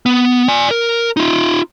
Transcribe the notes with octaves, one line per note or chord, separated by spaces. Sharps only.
B3
D5 G#5
A#4
D#4 F4